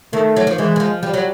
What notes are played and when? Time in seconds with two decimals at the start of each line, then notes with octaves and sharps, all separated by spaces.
0.13 D#3 A3
0.36 F#3
0.47 F3
0.58 E3 G#3
0.76 E3
0.80 F3
1.02 F3 G3
1.14 F#3